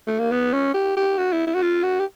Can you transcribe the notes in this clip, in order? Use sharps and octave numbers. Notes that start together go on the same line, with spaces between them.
A3
A#3
B3
C#4
G4
G4
F#4
E4
E4
F#4
F4
F#4
G4